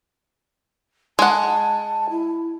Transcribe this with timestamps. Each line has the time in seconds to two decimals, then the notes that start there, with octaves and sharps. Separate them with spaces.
1.19 G#3 F#5 A5
2.10 E4